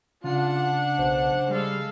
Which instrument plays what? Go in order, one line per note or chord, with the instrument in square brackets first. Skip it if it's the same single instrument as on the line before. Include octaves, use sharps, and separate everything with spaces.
[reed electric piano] C#3 [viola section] D4 F#5 [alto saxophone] F4
[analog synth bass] B1 [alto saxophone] C5
[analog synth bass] G3 [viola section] G#3 A4 F5